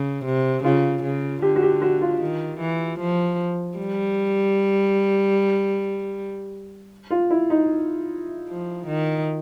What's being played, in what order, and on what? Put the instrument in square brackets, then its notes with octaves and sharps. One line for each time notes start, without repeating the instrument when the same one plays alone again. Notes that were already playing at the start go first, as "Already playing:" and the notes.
Already playing: [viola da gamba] C#3
C3
[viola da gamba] C#3 [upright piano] F4
[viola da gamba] C#3
[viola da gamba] D3 [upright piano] G4
[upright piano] F#4
G4
F#4
F4
[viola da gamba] D#3
E3
F3
G3
[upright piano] F4
E4
D#4
[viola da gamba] F3
D#3